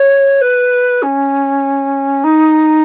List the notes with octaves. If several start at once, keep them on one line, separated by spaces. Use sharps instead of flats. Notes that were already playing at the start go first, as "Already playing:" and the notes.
Already playing: C#5
B4
C#4
D#4